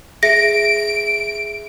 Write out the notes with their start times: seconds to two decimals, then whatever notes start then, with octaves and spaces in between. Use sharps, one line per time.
0.23 G#4 E5 A#6 D7